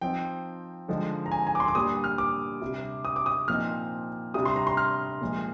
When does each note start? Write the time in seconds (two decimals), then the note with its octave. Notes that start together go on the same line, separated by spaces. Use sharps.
0.01 F3 C4 D#4 G5
0.88 D3 F3 G#3 D#4
1.26 A#5
1.32 G#5
1.47 G#5
1.55 D6
1.60 C6
1.68 D6
1.75 A#2 G3 D4 D#6
2.04 F6
2.18 D6
2.61 C3 G3 D4
3.05 D#6
3.16 D6
3.26 D#6
3.48 A#2 F3 C4 D#4 F6
4.34 C3 G3 D4 D#6
4.45 C6
4.56 A#5
4.67 C6
4.77 F6
5.21 A#2 F3 G#3